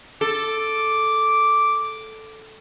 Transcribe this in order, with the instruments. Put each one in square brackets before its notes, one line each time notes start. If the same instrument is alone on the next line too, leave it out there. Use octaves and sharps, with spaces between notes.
[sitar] A4 [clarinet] D6